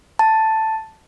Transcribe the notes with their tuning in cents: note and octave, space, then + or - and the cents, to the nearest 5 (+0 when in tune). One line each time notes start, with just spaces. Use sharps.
A5 +5